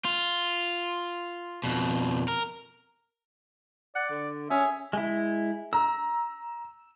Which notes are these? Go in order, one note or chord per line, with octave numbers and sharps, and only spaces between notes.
F4
F2 B2
A#4
D5 F#5
D3
C#4 G#4 E5
G#3 E4
A#5 E6